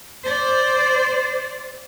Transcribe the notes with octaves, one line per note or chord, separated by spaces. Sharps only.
C5 D5